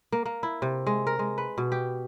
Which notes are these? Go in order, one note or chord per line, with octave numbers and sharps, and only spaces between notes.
A#3
A#3
E4
C3
G#3
A#4
G#3
B4
B2
G4